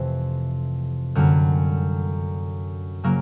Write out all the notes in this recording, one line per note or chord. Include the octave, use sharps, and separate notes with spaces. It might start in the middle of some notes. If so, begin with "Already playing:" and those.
Already playing: F2 C3 E3 A3
F#2 D3 G3 A#3 C#4
C#3 F#3 A#3